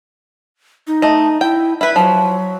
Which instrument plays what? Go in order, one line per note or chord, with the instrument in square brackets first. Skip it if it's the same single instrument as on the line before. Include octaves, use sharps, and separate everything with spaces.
[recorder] D#4
[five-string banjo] A3 D#5
[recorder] E4 [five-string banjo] G5
[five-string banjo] E4 B4 [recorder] E5
[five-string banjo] F3 [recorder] F#3